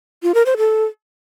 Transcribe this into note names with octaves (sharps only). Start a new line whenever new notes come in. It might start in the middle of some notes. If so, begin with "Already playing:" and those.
F4
A#4
C5
A4